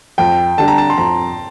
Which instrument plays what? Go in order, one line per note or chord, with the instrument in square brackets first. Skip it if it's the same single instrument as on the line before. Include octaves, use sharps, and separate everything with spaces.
[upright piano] F2 [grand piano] G5
[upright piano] D3 G3 D4 [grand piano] A5
[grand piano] A#5
A5
C6
[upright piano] F2 [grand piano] A#5